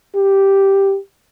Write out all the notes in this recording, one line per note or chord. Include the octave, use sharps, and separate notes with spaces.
G4